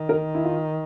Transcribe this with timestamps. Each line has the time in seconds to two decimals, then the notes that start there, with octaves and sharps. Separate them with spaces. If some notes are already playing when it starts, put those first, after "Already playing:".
Already playing: D#3
0.09 A#4
0.35 E4
0.45 F4